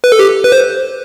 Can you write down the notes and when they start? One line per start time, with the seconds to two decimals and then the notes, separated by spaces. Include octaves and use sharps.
0.04 B4
0.12 A4
0.19 G4
0.44 B4
0.52 C5